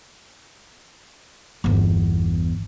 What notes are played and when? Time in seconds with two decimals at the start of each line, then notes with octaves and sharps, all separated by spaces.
1.64 G1 E2